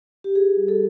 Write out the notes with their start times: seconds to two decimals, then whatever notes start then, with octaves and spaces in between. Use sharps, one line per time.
0.24 G4
0.34 F4 G#4
0.57 G3
0.68 A4